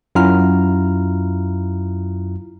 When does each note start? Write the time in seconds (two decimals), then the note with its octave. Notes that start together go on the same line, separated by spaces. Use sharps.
0.15 F#2 E4 F4 A#5 F6